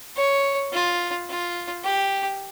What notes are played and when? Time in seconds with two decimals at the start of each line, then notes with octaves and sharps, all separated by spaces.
0.17 C#5
0.73 F4
1.30 F4
1.85 G4